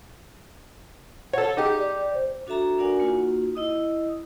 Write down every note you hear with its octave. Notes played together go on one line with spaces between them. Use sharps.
A4 C#5 F#5
D#4 G4 G#4
D5
C5
D4 F#4 A4 E5 A#5
D4 F#4 A#4 D5 F#5 G#5
A#3 D#4 F4 F#4
E4 D#5 D#6